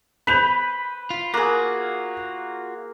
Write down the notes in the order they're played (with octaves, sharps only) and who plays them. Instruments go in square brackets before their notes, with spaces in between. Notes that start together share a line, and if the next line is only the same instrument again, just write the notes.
[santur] B4 C5 [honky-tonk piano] B5 F7
[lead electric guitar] F4
[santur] A#3 G#4 [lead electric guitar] F4 F#4